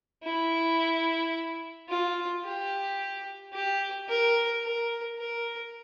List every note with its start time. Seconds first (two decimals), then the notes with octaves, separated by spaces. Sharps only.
0.24 E4
1.89 F4
2.45 G4
3.53 G4
4.09 A#4
4.64 A#4
5.19 A#4